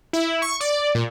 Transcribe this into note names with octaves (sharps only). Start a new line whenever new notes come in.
E4
C#6
D5
A#2